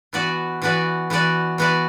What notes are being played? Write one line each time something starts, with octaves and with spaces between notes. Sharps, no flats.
E3 B3 F#4 B4 D5
E3 B3 F#4 B4 D5
E3 B3 F#4 B4 D5
E3 B3 F#4 B4 D5